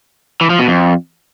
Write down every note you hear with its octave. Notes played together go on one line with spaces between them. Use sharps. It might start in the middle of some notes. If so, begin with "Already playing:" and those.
E3
F3
B2
F2